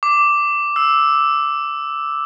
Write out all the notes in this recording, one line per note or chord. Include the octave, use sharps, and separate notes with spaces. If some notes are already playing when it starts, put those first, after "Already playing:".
D6
E6